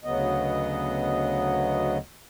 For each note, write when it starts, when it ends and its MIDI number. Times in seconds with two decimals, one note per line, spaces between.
0.04 1.98 38
0.04 1.98 49
0.04 1.98 54
0.04 1.98 59
0.04 1.98 75